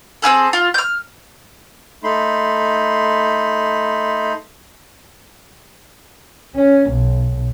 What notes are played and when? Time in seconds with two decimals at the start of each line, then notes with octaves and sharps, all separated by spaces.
0.22 C4 D#4 G#4 A4
0.53 F4
0.74 F6 G6
2.04 A3 D#4 B5 C6
6.55 C#4
6.90 B1